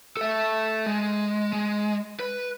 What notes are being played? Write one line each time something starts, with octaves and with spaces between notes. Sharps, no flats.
A4 E5
G#3
G#3
B4